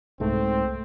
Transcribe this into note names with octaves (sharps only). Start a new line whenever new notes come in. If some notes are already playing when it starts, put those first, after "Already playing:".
C2 G#2 A3 C4